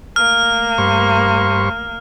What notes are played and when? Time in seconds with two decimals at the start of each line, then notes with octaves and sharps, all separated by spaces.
0.16 A3 A#3 F6
0.78 G2 C5 C#6